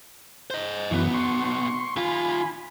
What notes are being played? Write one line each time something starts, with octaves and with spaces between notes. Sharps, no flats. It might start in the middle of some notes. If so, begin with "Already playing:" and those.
C5 D#5
B1 F#2 E3 B3
C6 C#6
D#2 F4 G#5 B5